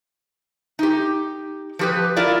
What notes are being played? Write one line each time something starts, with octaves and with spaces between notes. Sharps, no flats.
D#4 G4
F3 G4 B4
E4 F4 A#4 D5